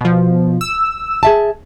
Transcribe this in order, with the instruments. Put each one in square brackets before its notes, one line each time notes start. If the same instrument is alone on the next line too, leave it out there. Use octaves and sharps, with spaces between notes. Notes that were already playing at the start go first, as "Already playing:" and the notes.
[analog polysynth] B2 F3
E6
[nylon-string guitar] G#4 E5 A5